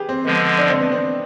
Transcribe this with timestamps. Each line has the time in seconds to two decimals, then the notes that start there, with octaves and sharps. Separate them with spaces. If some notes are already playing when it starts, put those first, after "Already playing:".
Already playing: G4 G#4 B4
0.09 C4
0.25 D3 F3 G#3 B3
0.58 D4
0.69 C4
0.80 B3
0.92 C4